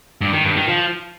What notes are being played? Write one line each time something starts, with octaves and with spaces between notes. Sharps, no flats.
G2
D#3
G2
D#3
F3